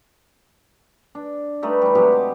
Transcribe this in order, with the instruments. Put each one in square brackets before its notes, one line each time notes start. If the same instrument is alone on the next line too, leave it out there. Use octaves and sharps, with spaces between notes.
[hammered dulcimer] D4
G3 A3 D#4 B4
E3 G3
C3 F#3 G#3 G4
D6